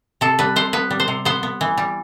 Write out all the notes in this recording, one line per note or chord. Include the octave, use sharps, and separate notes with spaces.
C3 A4
G3 B4
C3 C5
B3 B4
G3
C5
C3
B3 C5
B3
E3
G3